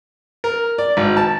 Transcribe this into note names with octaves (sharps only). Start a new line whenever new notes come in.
A#4
D5
G#1
A5